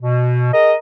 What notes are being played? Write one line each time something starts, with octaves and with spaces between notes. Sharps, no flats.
B2
G#4 A#4 D#5